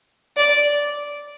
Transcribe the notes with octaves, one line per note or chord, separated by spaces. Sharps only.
D5